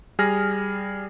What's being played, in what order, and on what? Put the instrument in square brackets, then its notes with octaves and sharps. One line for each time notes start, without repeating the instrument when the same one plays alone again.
[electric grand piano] G3 G#4 F6 A#6